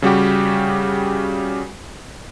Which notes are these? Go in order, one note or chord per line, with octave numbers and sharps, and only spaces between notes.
C#3 G3 F#4 G4